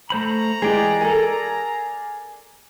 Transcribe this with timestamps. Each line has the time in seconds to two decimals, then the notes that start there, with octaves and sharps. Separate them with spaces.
0.10 A3 C5 A#5 B5
0.62 E3 G#3 G4 G#4 D5
1.01 A4 A#4 G#5